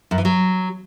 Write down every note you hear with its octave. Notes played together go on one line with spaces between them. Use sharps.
F#2
E3
F#3